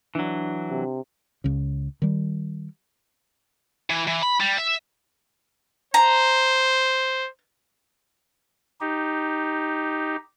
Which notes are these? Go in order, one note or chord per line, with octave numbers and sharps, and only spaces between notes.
E3 F#3 D4
C3
C#2 C#3
D#3 G3
E3
E3
B5
G3
E5
C5 A#5
D#4 G4